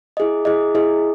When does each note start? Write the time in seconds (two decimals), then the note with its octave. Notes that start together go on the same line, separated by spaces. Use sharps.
0.17 E4 G#4 D#5
0.45 E4 G#4 D#5
0.75 E4 G#4 D#5